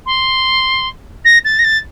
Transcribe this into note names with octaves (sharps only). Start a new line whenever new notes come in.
C6
A#6
A6
A#6
A6